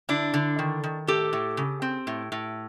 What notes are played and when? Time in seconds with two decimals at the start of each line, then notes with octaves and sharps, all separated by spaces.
0.09 D3 D4 E4
0.34 D3
0.59 D#3
0.84 D#3
1.07 A2 G4 A4
1.33 A2
1.57 C#3
1.82 C4
2.07 A2
2.32 A2